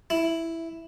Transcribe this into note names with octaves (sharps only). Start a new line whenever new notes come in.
E4